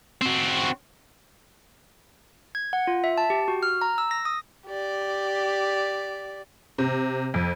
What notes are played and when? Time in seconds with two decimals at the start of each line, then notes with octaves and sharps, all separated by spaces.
0.21 C4 F#4
2.55 G#6
2.73 F#5
2.87 F4
3.04 E5
3.18 A5
3.30 G4
3.48 F#4
3.63 F6
3.82 A#5
3.98 E6
4.11 A#6
4.25 D#6
4.67 G4 D5
6.78 C3
7.34 F2